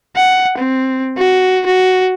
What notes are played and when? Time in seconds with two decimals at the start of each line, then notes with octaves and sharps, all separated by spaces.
0.16 F#5
0.58 C4
1.18 F#4
1.66 F#4